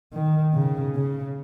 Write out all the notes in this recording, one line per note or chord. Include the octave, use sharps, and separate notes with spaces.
D#3
C#3
C#3